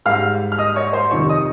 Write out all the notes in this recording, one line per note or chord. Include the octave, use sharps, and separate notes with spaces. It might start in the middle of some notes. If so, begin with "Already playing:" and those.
G#2 G3 F5 F6
F6
D#5 D#6
C#5 C#6
C5 C6
F2 C3 D#3 G3 C#5 C#6
D#5 D#6